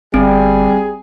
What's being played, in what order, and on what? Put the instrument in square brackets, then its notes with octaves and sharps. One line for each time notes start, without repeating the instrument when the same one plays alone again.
[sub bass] G1 [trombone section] G3 [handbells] C4 [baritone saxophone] G#4